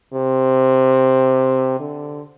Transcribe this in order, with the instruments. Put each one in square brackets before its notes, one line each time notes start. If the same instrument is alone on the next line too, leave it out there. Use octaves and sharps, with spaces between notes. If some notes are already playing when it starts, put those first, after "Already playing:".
[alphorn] C3
D3